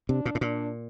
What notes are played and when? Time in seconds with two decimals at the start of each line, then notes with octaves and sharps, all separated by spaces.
0.09 C3 D4
0.25 A#2
0.35 A2
0.41 A#2 D4